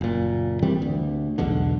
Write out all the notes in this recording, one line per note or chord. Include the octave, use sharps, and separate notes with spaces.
F#1 A#2
D#3 E3 G3 C4
D2
B1 E2 B2 D3